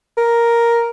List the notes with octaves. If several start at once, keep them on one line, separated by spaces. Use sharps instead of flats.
A#4